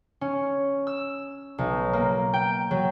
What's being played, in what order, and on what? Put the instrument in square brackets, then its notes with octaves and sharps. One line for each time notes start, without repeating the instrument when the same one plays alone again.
[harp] C#4
E6
B1
A#3
G5
F#3